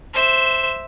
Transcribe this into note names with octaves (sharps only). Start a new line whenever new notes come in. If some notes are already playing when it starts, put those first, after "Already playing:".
C5 E5